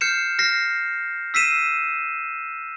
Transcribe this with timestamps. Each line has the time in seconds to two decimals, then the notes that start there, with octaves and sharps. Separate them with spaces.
0.01 F6 G6 C7 C#7 E7
0.39 F6 A#6 C7
1.34 E6 B6 C7 D#7 E7